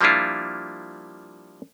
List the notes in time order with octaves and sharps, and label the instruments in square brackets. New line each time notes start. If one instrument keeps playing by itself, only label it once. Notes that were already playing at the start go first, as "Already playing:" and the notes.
[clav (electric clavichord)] F3 G3 A#3 D4 E4 F4